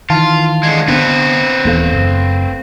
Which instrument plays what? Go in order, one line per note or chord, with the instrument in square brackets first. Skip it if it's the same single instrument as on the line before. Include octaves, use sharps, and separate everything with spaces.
[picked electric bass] D#3 E3 [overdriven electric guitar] F4 [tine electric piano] F5 A5 C6
[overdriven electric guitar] D3 G#3
[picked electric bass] D3 B3 D4 [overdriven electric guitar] C4 B4
[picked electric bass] D#1 E3 B3 [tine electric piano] A3 A4 F5
[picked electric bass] F#1